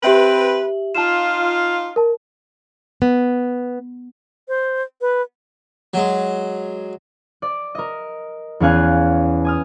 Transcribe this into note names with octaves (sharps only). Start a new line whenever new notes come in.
C4 G4 B4 E5 F#7
D#4 F4 A5 E7
A#4 A5
B3
C5
B4
F#3 G#3
D5
A#4 D#5
E2 B3 C#4 F5 G#5 F#6
G#5 D#6 F6